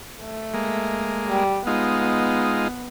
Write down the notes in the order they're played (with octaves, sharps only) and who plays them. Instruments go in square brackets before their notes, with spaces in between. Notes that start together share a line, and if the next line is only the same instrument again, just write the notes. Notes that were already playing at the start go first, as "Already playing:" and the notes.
[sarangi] A3
[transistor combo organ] G#3 A#3
[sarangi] G3
[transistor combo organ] G#3 D#4 F4 [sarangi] B3